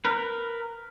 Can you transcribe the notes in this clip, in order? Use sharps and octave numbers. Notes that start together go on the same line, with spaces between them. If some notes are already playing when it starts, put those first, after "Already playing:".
A#4 B4